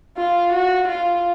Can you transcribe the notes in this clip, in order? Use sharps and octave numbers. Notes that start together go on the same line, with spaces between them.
F4
F#4
F4